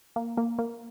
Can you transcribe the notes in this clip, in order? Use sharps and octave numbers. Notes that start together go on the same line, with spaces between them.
A#3
A#3
A#3